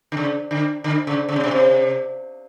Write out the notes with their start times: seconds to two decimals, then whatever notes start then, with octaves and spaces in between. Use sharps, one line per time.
0.12 D3
0.17 C#3
0.51 D3
0.84 D3
1.07 C#3
1.29 C#3
1.36 C3
1.44 B2
1.51 C3